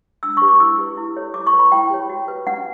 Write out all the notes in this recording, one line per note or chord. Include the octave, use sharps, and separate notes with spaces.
D4 E6
G4 B4 C#6
D6
E4 E6
G4 B4
E4
A4 C#5
E4 D6
C#6
B4
B5
E4 G5
G4 C#5
F#4
B4
C#4 F#5